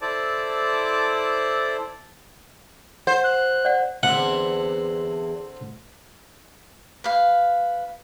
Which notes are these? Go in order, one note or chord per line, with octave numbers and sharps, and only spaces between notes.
E4 A4 C5 D5 A5 D6
C5 F#5
F#6
D5 F#5
E2 D3 C4 E4 F#5
B4 F5